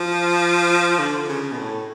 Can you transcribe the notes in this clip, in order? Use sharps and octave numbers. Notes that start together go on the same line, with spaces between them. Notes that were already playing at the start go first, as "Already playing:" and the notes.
Already playing: F3
D3
C#3
B2
A2